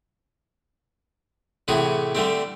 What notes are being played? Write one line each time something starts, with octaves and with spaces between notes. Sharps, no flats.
A2 C3 E3 F#4 G#4
D3 G3 A3 C4